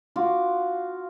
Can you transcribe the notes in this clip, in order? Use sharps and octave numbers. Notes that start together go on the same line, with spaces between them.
F4 F#4 D6